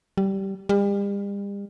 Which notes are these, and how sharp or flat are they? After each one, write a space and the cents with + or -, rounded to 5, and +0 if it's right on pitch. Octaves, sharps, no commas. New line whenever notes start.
G3 -15
G3 +40